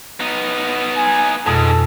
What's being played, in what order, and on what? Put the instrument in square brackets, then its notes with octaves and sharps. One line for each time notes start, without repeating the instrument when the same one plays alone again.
[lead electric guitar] B3 D#4
[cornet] G#5
[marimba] F2 B2 [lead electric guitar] G#2 [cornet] A4